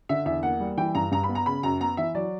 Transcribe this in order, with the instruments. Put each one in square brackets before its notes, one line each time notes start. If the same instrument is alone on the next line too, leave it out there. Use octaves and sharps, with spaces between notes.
[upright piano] D3 E5
E2 E5
A#3 F#5
G3
E3 G5
G2 A#5
G2 A#5
B5
B3
A#5
C#3 B5
F#2 A#5
B3 A#5
E3 E5
F#3 D5